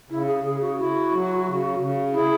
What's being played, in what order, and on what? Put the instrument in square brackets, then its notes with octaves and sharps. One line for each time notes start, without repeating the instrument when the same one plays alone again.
[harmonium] C#3 [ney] E4
[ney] G#4
[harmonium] C#3 [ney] G#4
[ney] F#4
[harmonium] E4 [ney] F#4
[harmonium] F#3
C#3
C#3
[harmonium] E4 [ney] G#4